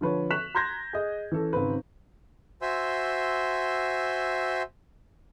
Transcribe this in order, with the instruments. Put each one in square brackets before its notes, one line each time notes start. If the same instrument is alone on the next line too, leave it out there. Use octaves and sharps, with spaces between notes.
[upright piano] D3 F3 B4 C#5
C#6 F#6 B6 E7 F7
A#5 C6 G6 G#6 A#6
G#4 D#5
E3 C#4 A4
G#1 C#3 C4 B4
[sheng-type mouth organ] F#4 C5 E5 G#5 C6 E6